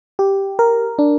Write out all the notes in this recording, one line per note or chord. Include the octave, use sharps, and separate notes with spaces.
G4
A#4
D4